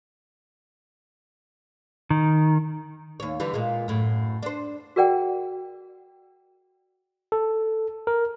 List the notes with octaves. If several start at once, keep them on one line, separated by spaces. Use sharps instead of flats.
D#3
D#2 C#5
D3 E3 G3
A#2 G#3
F#2 A2
D4 C5
F#4 G#4 A#4 D5 F#5 G5
A4
A#4